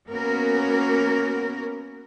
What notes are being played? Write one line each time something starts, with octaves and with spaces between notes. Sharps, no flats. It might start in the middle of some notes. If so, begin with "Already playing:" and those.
A#3 B3 C#4 F#4 A#4